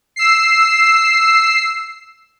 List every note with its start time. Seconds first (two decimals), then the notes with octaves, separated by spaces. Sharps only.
0.16 E6 C7